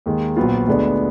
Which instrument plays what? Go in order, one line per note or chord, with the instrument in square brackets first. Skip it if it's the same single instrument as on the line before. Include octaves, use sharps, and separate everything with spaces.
[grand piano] D#2 D#3 G#3
A#1 A#2 F#3 B3 F4
D2 D3 G#3 B3 D4